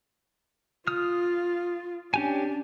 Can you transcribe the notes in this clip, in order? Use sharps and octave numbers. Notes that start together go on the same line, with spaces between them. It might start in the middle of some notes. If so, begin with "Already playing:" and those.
F4 D#6 F6
C#4 D4 G4 G#5